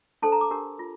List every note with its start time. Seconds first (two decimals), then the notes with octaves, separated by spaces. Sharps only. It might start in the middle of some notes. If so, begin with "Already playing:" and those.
0.22 D4 A4 C5 A5
0.32 A#5
0.41 D6
0.51 D4 G4 A#4
0.79 F4